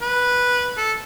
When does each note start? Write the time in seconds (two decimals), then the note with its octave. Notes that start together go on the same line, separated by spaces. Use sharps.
0.01 B4
0.77 A4